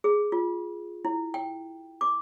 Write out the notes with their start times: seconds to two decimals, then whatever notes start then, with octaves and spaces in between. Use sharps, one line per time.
0.04 G#4
0.32 F4
1.05 E4
1.34 G5
2.01 D6